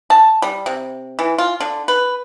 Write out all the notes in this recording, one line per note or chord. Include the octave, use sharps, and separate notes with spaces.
A5
G3
C3
E3
F4
D3
B4